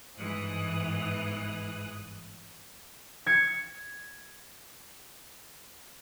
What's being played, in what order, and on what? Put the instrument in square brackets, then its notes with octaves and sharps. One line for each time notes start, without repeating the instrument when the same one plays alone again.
[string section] G1 G#2 E3 D#6 F#6
[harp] G#6 C#7